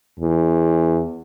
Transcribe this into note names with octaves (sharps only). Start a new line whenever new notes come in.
E2